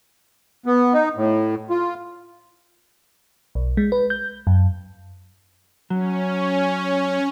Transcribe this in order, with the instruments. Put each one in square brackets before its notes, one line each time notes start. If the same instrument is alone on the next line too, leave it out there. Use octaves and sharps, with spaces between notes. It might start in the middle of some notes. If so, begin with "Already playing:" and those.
[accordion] B3
D#4
A2
F4
[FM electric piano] B1
G#3
B4
G6
F#2
[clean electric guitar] F#3 [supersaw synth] C#4